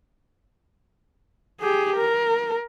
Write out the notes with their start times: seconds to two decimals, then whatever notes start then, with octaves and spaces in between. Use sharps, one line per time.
1.60 G4 G#4
1.96 A#4